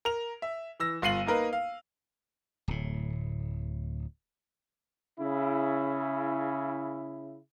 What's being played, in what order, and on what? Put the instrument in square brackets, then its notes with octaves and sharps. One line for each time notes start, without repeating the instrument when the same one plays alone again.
[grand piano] A#4 F7
E5
E3 E6 A#6
G1 F4 C7 D#7 F#7
A#3 D#4 A#4 B4
F5
[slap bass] D1 A2
[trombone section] C#3 E4